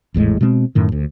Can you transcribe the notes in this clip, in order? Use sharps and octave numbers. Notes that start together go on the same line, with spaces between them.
G#1 E2 A2 G#3
B2 G#3 A#3 C4
F#2 A2 D#3
D2